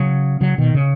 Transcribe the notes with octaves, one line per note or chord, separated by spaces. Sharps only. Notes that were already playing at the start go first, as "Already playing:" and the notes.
Already playing: C#3 F#3
C#3 F#3
B2 D#3
C#3